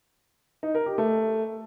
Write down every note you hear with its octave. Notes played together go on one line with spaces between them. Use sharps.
D#4
A#4
G4
A3